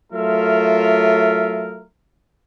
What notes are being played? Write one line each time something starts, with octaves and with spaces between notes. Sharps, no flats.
F#3 A3 F4 A#4 E5